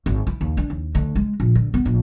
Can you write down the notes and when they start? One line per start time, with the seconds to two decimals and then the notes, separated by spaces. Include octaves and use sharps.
0.06 G#1
0.27 E4
0.41 D#2
0.57 D4
0.70 D#2
0.95 D2
1.15 G#3
1.40 A#1
1.55 D3
1.74 B3
1.86 A#1